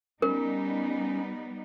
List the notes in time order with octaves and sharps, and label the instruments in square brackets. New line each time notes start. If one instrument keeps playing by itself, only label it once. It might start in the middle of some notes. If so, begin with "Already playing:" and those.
[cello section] G3 B3 D#4 [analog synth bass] C#4 [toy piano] A#4